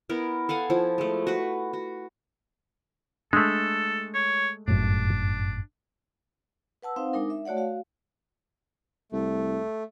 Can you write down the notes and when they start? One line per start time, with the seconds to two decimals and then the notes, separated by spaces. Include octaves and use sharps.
0.09 B3 E4 A#4
0.49 A4 F5 F#5 G#5
0.70 F3 E4
0.98 G#3 A3
1.27 F#4 B4
1.73 F#4
3.33 G#3 A3 D4 A4
4.15 C#5
4.68 G1 F#2 A2 D4
6.82 B4 F#5 A5 E6
6.96 C4 D#4 C5 F5 F#5
7.13 G#3 D4 D#4 A#4
7.30 E5
7.45 A3 F#4 C#5 D5 F#5
7.57 F#4 F5
9.12 C2 A3